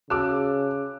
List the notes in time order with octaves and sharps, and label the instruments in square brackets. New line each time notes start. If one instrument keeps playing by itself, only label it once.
[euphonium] C#3 [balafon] F#4 G#4 [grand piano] A5 D6 E6 [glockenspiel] F#6